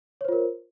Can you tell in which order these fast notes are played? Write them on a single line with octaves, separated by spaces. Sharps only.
C#5 C5 F4 A#4